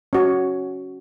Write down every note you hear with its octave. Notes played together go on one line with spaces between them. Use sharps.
C#4 F#4 C#5